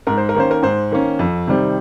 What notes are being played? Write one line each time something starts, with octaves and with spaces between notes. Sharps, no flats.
G#2 A#4
C5
A#4
D#3 A#3 C#4 C5
A#4
G#2 C5
D#3 A#3 C#4
F2
C3 D#3 G3 C4